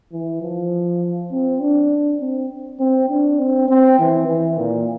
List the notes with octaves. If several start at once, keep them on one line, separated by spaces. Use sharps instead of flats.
E3
F3
C4
D4
C4
C4
D4
C4
C4
E3
E3
A#2